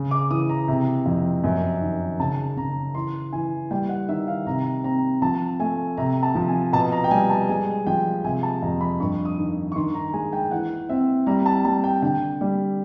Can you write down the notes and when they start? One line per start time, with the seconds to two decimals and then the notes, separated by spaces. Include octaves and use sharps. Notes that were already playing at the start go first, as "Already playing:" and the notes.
Already playing: C#3
0.11 D6
0.31 E3 D#6
0.49 A#5
0.68 C3
1.06 F2
1.44 F#2
1.82 D#3
2.20 C#3 A5
2.57 C#3 A#5
2.95 E3 C6
3.33 E3 G#5
3.71 G3 G5
3.89 F#5
4.09 D#3 E5
4.27 F5
4.46 C3 A#5
4.84 C4 A#5
5.22 F3 A5
5.60 A3 G#5
5.97 C3 A#5
6.23 A5
6.35 F3
6.49 G#5
6.73 B2 A5
6.92 A#5
7.04 G5
7.11 G3 G#5
7.30 A5
7.49 G#3 G#5
7.87 F3 G5
8.24 C3 G#5
8.43 A5
8.62 F2 A#5
8.81 B5
9.00 G2 C#6
9.25 D#6
9.38 D#3
9.72 C#6
9.76 D#3 C6
9.95 A#5
10.13 G#3 G#5
10.33 G5
10.51 E3 F#5
10.89 C4 E5
11.27 G3 A#5
11.46 A5
11.65 G3 A5
11.84 G5
12.02 D3 G5
12.41 G3